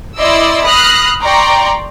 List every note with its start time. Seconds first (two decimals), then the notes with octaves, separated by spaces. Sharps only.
0.17 E4 D5 D#5 C6 D6 E6
0.63 B5 D#6 F6 F#6 A#6 C7
1.21 D5 G5 A#5 C6 C#6